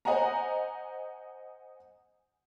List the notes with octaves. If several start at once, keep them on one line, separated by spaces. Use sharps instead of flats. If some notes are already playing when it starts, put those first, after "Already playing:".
C5 D#5 F#5 G#5 A#5